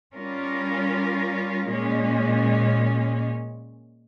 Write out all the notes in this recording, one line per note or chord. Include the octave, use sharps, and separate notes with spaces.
G3 C#4 F4 A#4
A#2 G#3 C#4